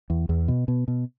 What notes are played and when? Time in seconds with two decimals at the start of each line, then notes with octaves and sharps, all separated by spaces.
0.10 E2
0.29 E2
0.48 B2
0.68 B2
0.88 B2